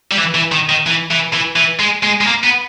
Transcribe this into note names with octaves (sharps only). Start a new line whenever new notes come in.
G3
E3
E3
D#3
D#3
E3
E3
E3
E3
G#3
G#3
G#3
A#3
B3